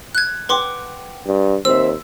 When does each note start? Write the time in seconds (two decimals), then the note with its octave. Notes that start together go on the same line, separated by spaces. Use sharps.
0.15 F#6 G#6
0.49 B4 F#5 G5 C6 D6
1.27 G2
1.65 D#2 C4 E5 E6